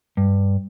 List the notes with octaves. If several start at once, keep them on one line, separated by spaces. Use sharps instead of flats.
G2